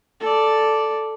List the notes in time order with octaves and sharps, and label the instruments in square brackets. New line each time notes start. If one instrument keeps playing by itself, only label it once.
[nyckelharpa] A4 D5